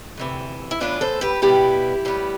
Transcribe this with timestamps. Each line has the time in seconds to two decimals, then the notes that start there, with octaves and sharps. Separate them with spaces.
0.17 D2 C3 E3
0.71 E4
0.80 A2 E3 B3 D4 F4
1.01 A4 C5
1.21 G4 B4
1.42 B2 G3 B3 E4 G4
2.05 A2 G3 B3